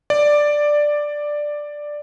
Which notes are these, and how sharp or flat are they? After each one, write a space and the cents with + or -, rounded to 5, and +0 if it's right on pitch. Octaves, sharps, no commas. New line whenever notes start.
D5 +5